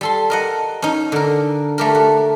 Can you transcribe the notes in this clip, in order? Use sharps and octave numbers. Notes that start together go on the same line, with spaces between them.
G3 A4 C6
A#4 D#5 F#5
C#4 D#4
D3 A#4
A3 G4 A#4
F#4